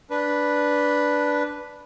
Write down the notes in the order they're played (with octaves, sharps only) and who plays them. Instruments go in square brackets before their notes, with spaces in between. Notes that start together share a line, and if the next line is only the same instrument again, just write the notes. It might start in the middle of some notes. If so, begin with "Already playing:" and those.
[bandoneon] D4 B4